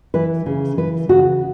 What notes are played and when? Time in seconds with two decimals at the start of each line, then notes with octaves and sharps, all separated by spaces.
0.14 E3 B4
0.46 C#3
0.77 E3 B4
1.09 C#3 F#4